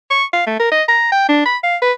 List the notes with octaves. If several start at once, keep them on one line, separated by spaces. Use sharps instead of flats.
C#6
F5
A3
A#4
D#5
A#5
G5
D4
B5
F5
B4